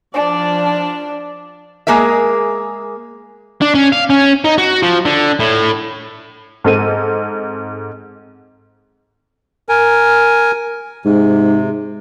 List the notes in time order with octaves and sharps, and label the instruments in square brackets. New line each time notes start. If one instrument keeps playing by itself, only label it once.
[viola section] F3 D5 [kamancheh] D4
[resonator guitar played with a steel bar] G#3 A#3 G#4 A#4 E5
[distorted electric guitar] D4
C#4
F5
C#4
D#4
F#4
F3
D3
A2
[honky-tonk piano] G#2 C4 A4 D#7
[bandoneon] A#4 G#5
[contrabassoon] G#2 [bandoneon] C3